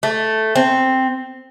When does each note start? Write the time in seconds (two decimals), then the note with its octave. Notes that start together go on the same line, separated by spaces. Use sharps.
0.03 A3
0.55 C4